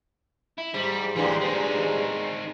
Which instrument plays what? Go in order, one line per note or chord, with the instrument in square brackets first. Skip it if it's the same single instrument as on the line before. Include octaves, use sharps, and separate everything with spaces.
[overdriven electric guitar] E4
[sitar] G#2 [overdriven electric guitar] G3
[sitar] G2 A#2 G#3 [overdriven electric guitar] E3 G4
[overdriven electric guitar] C4 D#4